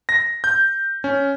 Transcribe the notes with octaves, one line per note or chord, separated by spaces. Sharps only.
A#6
G6
C#4